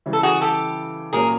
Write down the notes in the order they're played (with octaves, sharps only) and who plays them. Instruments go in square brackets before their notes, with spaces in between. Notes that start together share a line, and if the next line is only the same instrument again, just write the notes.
[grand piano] C#3 E3 G3
[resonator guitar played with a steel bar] A4
F#4 G#4
G4 A4
[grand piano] A#2 F#3 A#3 C#4 [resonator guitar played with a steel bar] G#4 A#4